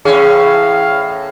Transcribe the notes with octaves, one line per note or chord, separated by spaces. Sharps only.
E2 A2 C#4 G#4 F5